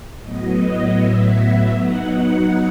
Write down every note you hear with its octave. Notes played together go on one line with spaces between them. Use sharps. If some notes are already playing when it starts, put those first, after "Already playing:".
A2 F#3 B3 D#5
E5
F#3 B3 D#4 F#5